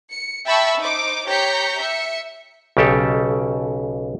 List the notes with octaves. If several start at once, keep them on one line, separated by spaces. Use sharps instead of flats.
C#7
E5 G5 A5 B5 C#6 E6
D#4 C5 D6
G4 C#5 A#5 G6 B6 C#7
E5 C#7
B1 C#3 G4 A4